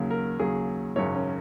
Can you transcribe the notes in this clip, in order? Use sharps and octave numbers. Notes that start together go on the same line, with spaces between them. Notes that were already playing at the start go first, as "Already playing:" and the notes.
Already playing: D#2 C#3 F#3
A#4
D#2 C#3 F#3 G#4
G#1 F#2 C#3 C#5
C#4